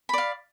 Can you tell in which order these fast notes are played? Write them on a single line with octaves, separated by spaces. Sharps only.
B5 D5 F5